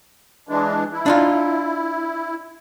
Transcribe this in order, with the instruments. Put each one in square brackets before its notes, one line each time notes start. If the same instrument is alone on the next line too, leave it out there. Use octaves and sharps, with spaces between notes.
[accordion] E3 G#3 D4
E4
[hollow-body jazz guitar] D4 D#4 F4